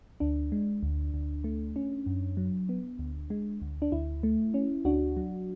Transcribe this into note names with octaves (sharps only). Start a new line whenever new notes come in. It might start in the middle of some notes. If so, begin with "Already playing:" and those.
D2 D4
G#3
D2
D2
A3
C#4
F#2
F#3
B3
D2
G#3
D2
D4
D2 E4
A3
C#4
D2 D4 F#4
F#3